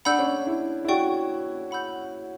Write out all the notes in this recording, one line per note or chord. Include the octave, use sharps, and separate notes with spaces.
D4 F#5 B5 E6 G6
C#4
D4
E4
E4
F#4 D5 G5 C#6
F#5 B5 E6 G6